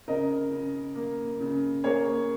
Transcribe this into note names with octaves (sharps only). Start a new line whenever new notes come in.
C#3 A#4 D#5
C#3
A#3
C#3
A#3 G#4 C#5